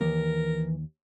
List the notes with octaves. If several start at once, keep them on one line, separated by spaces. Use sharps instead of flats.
D#2 E3 A#4